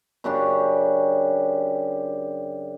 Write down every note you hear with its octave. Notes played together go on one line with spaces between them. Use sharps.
F#2 C#3 D4 G4